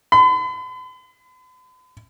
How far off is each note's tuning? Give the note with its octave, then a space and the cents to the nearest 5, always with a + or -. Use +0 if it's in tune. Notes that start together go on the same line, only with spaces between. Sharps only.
B5 +45